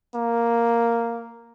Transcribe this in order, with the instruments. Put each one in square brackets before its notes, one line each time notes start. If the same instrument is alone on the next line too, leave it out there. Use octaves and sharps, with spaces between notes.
[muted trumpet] A#3